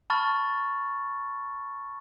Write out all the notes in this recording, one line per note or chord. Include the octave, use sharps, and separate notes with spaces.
A5 B5 C#6 F6 A6